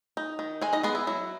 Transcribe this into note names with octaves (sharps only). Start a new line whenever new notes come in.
D#4
D#3
G#3 G#4 G#5
D#4 D#5
G#3 B3 G#4
E4
F#3 E4